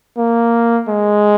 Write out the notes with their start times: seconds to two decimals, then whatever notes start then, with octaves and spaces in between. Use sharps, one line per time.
0.18 A#3
0.89 G#3